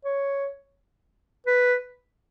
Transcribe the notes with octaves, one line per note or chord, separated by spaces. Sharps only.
C#5
B4